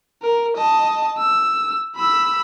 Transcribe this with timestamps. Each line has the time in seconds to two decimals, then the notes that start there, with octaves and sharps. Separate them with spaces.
0.22 A#4
0.57 D#5 A5
1.18 E6
1.96 B5 E6